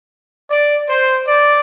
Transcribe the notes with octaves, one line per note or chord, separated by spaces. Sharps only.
D5
C5
D5